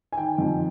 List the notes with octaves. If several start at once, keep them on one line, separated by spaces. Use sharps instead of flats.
G#5
D#3 G5
F2